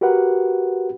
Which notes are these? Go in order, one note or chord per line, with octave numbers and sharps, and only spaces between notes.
F#4 G4 A#4 B4 F#5